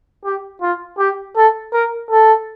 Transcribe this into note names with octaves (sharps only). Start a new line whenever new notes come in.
G4
F4
G4
A4
A#4
A4